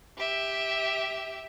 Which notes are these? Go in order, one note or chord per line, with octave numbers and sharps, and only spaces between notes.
G4 E5